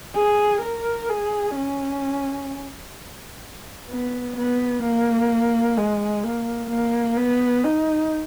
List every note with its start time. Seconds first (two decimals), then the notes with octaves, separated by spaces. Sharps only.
0.15 G#4
0.62 A#4
1.08 G#4
1.56 C#4
3.90 B3
4.37 B3
4.83 A#3
5.77 G#3
6.24 A#3
6.70 A#3
7.17 B3
7.64 D#4